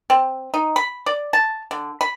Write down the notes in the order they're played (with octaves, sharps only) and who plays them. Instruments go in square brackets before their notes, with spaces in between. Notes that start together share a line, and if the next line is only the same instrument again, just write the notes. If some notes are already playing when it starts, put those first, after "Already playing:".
[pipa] C4
D#4
B5
D5
A5
D3
B5